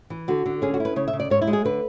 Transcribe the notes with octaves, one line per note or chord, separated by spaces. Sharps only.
E3
D3 F#4
D3
C#4 G#4
F#4
E4
B4
C#3 C#5
E5
C#3
D5
G#2 C#5
E4
G#3
G#4
D3 B4